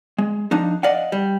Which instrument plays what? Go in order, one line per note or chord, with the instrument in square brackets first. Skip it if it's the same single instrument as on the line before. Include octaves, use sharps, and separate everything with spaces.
[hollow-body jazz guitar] G#3
F3 D4 D#4
D5 D#5 F5 F#5
G3